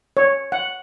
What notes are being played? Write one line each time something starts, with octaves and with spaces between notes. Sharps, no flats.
C#5
F#5